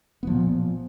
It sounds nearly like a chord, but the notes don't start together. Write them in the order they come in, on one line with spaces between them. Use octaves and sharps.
B3 F3 A#2